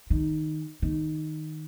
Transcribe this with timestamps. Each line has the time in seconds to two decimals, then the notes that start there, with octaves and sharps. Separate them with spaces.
0.10 D#3
0.82 D#3